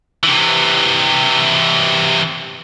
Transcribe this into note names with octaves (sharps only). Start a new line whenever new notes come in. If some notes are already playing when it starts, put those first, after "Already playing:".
C3 E3